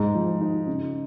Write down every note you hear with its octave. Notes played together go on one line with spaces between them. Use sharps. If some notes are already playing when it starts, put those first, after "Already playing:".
Already playing: G#2 D#4
F3
D#4
C#3